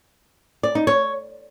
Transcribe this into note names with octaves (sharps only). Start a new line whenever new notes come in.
D5
D#4
C#5